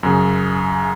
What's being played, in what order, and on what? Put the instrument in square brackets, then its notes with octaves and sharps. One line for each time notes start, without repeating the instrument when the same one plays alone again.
[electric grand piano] F#2 C#3